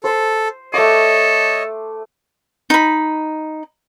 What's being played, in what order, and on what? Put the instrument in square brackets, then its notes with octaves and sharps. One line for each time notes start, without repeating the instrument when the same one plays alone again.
[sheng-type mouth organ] A4 [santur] C5
[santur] A3 D6 [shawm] A4 [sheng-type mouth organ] C#5 D#5
[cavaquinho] D#4 B5